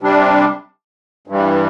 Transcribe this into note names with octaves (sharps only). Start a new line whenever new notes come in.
C3 G3 D4
G2 E3 G3